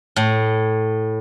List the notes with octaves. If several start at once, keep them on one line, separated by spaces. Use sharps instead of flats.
A2